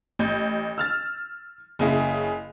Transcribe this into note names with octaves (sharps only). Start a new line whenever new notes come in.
A1 G6
E6 F6 A6
F#1 C#3 E4